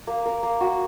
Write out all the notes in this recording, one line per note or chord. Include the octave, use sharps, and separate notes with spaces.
A#3
A#4
A#3
F#4